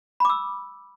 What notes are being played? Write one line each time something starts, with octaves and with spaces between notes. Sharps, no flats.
B5 D6 E6